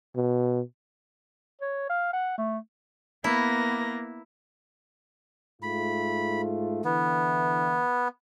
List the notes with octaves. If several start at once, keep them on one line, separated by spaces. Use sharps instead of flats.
B2
C#5
F5
F#5
A3
A#3 B3 E4 A#6
G#2 A3 F4 B5
D3 E3 B3